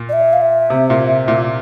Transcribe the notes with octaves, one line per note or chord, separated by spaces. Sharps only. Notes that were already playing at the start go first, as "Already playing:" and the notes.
Already playing: A#2
D5
E5
F5
E5
C3
A#2
A#2